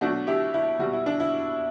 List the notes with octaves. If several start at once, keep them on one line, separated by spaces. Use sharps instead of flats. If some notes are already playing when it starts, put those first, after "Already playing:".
B2 F#3 A3 D4 F#4
E4 G4
E4
B2 G3 F#4
E4
D4
E4